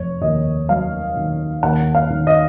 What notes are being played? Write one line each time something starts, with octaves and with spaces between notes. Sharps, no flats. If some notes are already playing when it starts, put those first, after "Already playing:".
Already playing: F1 C#5
D#2 D#5
F#3 F5
D#3
D#2 F#5
F5
D#3
D#5